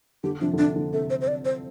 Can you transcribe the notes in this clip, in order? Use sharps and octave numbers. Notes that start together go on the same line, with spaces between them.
D3 G4
C3 F3 D4
D3
C3 D4
D3
C3 A4
C5
C5
D5
C5